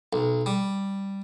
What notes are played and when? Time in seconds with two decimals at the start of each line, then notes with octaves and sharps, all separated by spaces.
0.13 B1
0.46 G3